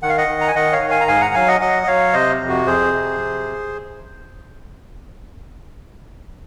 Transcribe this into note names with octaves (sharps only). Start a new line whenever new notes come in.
D#3 F#5
F5
D#5 F#5
D#3
A#5
G#5
D#3 D#5 F#5
C#5 F5
D#3
F5 G#5
A#5
G#2 F5 G#5
F#5 A#5
F#3 F5 G#5
D#5 F#5
F#3 D#5 F#5
D#5
F#3 C#5 F5
C3 C5 D#5
F2
F#4
F2 G#4 C5
C3